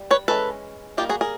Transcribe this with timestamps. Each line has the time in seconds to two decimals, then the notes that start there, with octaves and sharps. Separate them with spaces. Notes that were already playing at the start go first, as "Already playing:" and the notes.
Already playing: G3
0.11 B4 C#5
0.28 E3 G#3 C#4 A4 B4
0.97 G3 A#3 D#4 F4 G4
1.09 F#4 G#4
1.21 G#4 A#4